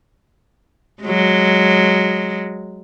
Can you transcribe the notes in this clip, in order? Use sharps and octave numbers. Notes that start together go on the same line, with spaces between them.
F#3 G#3